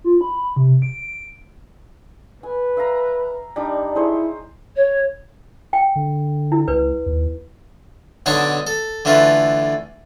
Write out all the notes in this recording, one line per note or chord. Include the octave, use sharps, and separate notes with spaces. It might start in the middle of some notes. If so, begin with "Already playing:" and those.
F4
B5
C3
D7
B4 G#5
E5 F5 A#5
G3 D4 D#4
E4 G#4 C5 C#5
C#5
G5
D3
E4
C#2 B4
D#2
B1 D3 D4 D#4 C#5 A5
A4
D3 E3 A3 F4 B4